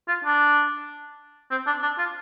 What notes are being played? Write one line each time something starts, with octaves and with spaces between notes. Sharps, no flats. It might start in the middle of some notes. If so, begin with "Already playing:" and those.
F4
D4
C4
D4
D4
F4